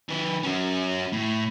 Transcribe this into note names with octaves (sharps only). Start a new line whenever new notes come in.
D#3 B4
C#4 F#4
A2